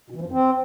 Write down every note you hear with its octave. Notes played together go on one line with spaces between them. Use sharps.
B2
E3
F3
F#2
C4